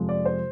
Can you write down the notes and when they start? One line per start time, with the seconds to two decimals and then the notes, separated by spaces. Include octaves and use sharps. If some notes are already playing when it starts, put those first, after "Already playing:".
Already playing: F2 C3 F3 G#3
0.09 D5
0.25 C5